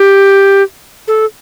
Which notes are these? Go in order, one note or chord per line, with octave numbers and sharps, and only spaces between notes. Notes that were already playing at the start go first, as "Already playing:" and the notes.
Already playing: G4
A4